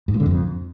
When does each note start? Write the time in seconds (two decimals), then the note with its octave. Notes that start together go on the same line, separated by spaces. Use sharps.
0.08 G#2
0.14 A#2
0.20 D3
0.26 F2